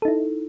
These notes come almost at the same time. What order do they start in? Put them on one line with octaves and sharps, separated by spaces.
A4 D#4 E4